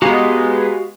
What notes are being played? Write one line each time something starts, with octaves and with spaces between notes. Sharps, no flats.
G#3 B3 D#4 F#4 G4 F5